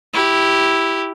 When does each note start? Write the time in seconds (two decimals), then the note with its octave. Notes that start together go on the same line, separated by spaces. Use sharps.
0.13 E4 G4